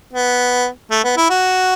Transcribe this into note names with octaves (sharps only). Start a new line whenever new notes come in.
B3
A3
B3
E4
F#4